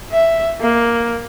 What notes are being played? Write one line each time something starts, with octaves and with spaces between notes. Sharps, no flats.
E5
A#3